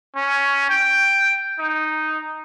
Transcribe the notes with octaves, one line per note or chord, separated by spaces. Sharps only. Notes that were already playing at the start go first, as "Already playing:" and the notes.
C#4
G5
D#4